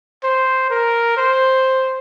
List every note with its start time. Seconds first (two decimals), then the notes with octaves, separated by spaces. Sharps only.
0.23 C5
0.70 A#4
1.17 C5